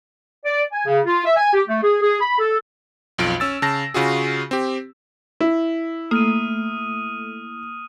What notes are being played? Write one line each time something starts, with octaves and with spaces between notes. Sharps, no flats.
D5
G#5
C#3
F4
E5
G#5
G4
A3
G#4
G#4
B5
A4
B1 F2 F4 D7
C#4 E6 A6
C#3 A5 A#6
C#3 F4 F#4 G#4
C4 G4
E4
A3 A#3 D#6 F6 D#7